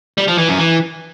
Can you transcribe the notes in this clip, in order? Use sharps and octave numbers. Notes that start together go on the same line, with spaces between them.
G3
F3
E3
F#2
E3